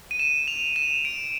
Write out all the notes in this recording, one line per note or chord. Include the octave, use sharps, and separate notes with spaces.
D#7
E7
F7
E7
D7